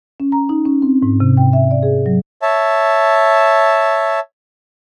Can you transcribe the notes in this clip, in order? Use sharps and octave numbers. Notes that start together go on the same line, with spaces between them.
C#4
A#5
D#4
C#4
C4
G#2
C3
G5
E5
D5
G#4
F#3
C#5 E5 A5